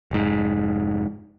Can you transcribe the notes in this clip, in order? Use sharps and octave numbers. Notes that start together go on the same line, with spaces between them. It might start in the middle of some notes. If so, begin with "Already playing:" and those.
F1 G#2